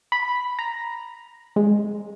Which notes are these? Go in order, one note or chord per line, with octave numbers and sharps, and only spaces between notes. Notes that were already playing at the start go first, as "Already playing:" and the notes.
B5
A#5
G#3